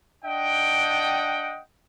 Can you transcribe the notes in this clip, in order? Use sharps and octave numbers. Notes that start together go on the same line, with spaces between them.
D4 D#5 F#5 G5